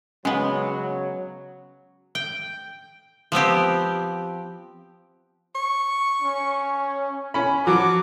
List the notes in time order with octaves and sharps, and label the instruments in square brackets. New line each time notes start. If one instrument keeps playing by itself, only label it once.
[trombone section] C#3 F#3 [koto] G#3 B3 [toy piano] C#4
[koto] G5
F3 B3 C4 G4
[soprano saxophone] C#6
[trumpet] C#4
[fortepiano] C#4 B5
[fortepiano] F3 F#3 [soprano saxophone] F#4 [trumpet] D6